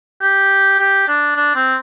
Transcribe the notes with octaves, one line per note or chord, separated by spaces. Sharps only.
G4
G4
D4
D4
C4